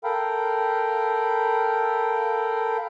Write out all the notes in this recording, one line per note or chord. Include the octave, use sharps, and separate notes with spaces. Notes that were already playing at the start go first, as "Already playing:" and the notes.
A4 A#4 F5 G5 B5